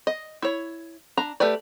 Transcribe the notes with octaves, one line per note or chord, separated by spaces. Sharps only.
D#5
E4 C#5
D4 A#5
A3 G4 B4 D5